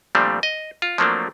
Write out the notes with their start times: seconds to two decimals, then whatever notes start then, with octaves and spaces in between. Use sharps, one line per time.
0.15 A#2 F3 G3 A3 C4 D4
0.43 D#5
0.82 F4
0.98 F3 F#3 A3 A#3 C4 D4